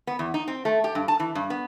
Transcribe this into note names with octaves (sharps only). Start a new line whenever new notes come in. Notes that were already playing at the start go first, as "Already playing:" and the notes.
B3
E2
D#4
C4
A3
G4
G2
A5
E3
G2
B3